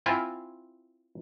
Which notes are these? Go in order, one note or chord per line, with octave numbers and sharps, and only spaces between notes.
C4 E4 F4 G#5